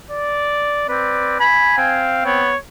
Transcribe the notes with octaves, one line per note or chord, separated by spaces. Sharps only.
D5
C4 B4 D5
G#5 B5
C4 F5
B3 C#5